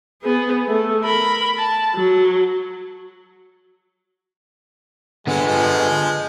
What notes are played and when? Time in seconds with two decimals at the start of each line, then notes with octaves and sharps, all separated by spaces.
0.22 B3 G#4
0.67 A3
1.03 A#4 B5
1.58 A5
1.95 F#3
5.27 D3 G#3 B3
5.46 F3 G#3